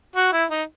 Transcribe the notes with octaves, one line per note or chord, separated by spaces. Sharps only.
F#4
E4
D#4